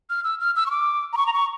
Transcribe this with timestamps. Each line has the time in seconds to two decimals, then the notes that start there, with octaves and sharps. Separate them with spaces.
0.10 F6
0.24 E6
0.40 F6
0.56 E6
0.66 C#6
0.71 D6
1.13 A#5
1.17 C#6
1.26 A#5
1.33 C#6